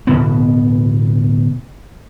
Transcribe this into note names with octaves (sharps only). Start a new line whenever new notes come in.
D1 B2 B3